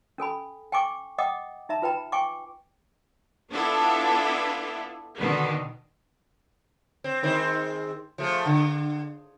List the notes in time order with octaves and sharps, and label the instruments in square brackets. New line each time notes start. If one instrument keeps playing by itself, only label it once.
[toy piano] C#4 A4 G#5 B5
G5 G#5 C#6 D6
D#5 F#5 G5 D6 D#6
D#4 E5 A#5
F4 B4 G5 A#5 B5
G5 G#5 C#6 D6
[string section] B3 D4 E4 F4 A4
B2 D3 D#3 B3
[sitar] C4
D#3 G#3 C4
F3 A3 G#4
D3